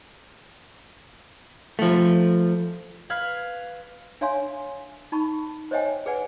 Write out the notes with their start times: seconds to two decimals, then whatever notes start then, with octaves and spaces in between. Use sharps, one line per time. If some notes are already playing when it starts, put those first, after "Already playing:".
1.79 F3 A3
3.10 B4 F5 F6 G#6
4.21 D4 C#5 E5 F5 G#5 C6
5.12 D#4 A5 B5 C#6
5.71 C5 C#5 D#5 E5 G5 G#5
6.06 G#4 B4 D5 F#5 G#5